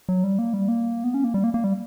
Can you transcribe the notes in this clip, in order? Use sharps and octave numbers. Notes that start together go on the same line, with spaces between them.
F#3
G3
A#3
G3
A#3
B3
C#4
A#3
G3
A#3
A#3
G3